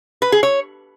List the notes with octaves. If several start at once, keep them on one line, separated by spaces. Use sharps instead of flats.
B4
G#4
C#5